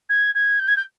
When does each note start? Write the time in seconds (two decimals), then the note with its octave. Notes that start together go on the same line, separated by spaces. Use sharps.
0.09 G#6
0.35 G#6
0.59 G6
0.68 G#6
0.76 G6